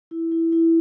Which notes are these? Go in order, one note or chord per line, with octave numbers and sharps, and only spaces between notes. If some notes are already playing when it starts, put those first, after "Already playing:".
E4
E4
E4